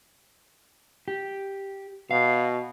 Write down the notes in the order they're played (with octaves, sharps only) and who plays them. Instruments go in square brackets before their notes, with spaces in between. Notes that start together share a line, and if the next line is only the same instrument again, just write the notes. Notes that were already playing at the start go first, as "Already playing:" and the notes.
[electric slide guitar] G4
[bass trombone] B2 [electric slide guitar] F5